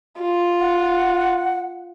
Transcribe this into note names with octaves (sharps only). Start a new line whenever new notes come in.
F4
F#5